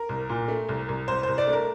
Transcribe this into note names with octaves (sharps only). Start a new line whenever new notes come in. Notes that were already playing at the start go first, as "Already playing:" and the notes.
Already playing: A#4
C2
A#2
A3
C2
C2
C2 C5
C2 C5
D5
A3
A#4